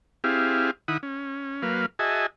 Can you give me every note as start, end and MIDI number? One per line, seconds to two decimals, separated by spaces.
0.24 0.71 60
0.24 0.71 64
0.24 0.71 67
0.24 0.71 68
0.24 0.71 77
0.88 0.98 51
0.88 0.98 64
0.88 0.98 78
0.88 0.98 83
0.88 0.98 87
1.03 1.63 61
1.63 1.86 54
1.63 1.86 58
1.63 1.86 71
1.63 1.86 77
1.99 2.26 66
1.99 2.26 68
1.99 2.26 75
1.99 2.26 76
1.99 2.26 80
1.99 2.26 81